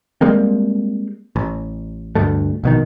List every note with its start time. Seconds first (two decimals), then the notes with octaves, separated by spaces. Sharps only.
0.21 G3 G#3 A#3 C4
1.36 A1
2.15 D2 G2 A3
2.64 A#1 B2 D#3